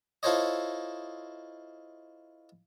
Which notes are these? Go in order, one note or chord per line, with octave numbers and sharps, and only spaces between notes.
E4 F4 A4 C5 C#5 D#5